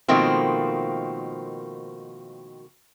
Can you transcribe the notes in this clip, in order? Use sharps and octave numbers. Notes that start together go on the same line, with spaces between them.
B2 D#3 F3 A3 A#3 C4